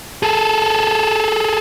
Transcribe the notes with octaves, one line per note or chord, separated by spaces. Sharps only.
G#4 A4